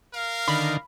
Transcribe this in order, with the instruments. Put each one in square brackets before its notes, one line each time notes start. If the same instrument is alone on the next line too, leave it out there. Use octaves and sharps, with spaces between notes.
[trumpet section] A#4 F5
[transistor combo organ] D3 D#3 [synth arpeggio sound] B5